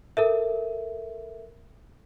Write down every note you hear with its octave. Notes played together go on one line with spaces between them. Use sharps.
A4 A#4 E5